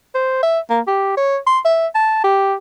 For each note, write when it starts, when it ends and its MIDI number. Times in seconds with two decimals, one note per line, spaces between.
0.15 0.40 72
0.43 0.60 76
0.70 0.81 58
0.88 1.15 67
1.17 1.38 73
1.47 1.59 84
1.65 1.88 76
1.95 2.20 81
2.24 2.55 67